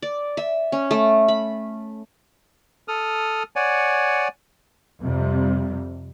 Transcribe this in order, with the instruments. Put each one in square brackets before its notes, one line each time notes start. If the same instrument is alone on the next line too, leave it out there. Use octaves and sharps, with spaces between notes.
[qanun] D5
E5
C#4
A3
B5
[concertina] A4 D#6 F6
C#5 D5 F#5 G#5
[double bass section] F2 C3 G3